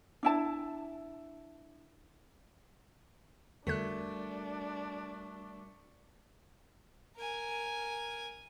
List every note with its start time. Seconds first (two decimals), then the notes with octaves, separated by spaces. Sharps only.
0.23 D4 E4 A5
3.67 E2 D3 G3 A3 D4 F#4 A#4 F#6
7.17 A#4 G#5